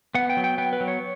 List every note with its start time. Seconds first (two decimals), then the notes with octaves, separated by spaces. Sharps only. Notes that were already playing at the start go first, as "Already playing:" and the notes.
0.15 B3 F#5
0.30 G5
0.37 F#3
0.44 G5
0.58 B3 G5
0.73 B4
0.81 F#3
0.88 C#5